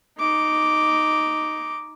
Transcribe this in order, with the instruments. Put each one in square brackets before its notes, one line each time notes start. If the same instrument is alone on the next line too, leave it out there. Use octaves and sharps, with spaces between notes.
[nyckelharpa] D#4 D6